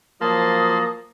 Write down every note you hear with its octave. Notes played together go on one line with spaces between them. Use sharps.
F3 F#3 A#3 A5 C6 D#6